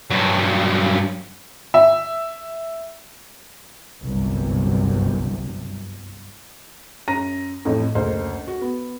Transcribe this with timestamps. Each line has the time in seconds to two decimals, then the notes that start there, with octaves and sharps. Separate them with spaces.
0.11 G2 F#3
1.74 E5
4.02 G1 C2 F#2 C3
7.08 F#2 A#5 A#6 D#7
7.65 A1 F2 A2
7.95 F#1 D2 C5
8.48 F#4
8.62 B3